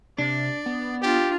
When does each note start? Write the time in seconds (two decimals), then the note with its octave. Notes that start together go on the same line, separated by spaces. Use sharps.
0.18 C3 D4 D5
0.66 B3
1.02 D4 F4 G4